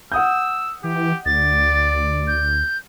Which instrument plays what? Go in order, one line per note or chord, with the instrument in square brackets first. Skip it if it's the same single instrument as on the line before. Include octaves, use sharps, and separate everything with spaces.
[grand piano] F#5 D#6 G6 [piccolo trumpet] E6
[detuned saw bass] E3 [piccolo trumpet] G4
[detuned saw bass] D2 [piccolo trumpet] D5 [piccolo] A6
[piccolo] G6